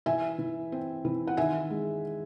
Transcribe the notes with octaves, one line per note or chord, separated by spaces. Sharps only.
E3 E5 G#5
E3
C4
E3
F#5
D#3 E5 G#5
G#3